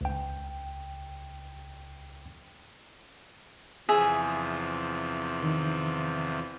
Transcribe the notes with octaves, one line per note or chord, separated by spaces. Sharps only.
C#2 G5
E2 C3 F3 G#4 E5
D#3